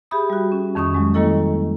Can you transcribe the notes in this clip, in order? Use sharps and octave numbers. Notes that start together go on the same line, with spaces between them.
G4 G#4 E5 B5 D#6
G3 F#4
C#4
F2 D#3 C#4 C#6 D#6
F#3 G#3
D#3 G3 A#3 E4 A4 D#5